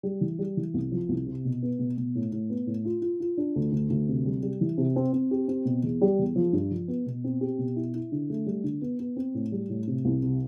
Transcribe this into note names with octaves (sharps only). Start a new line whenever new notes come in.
G3
E3
G3
E3
C2
F3
C2
C3
B2
B3
B2
B2
A2
A2
B3
A2
F4
F4
F4
D4
D2
D2
D2
C3
G3
G3
E3
C3
C4
C4
G4
C4
B2
E2
G3
E2
F3
G2
F3
B3
B2
C4
G4
B2
E4
E4
D3
A3
G3
D3
B3
B3
C4
A2
G3
A2
C3
C2
C3